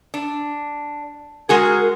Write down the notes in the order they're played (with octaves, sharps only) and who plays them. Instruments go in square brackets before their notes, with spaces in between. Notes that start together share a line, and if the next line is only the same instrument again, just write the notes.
[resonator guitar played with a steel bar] D4
[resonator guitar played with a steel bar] G#3 F#4 G#4 [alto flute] A#4